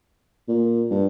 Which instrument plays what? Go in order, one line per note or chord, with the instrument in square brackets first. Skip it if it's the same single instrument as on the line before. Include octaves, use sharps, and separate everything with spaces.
[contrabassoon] A#2
G2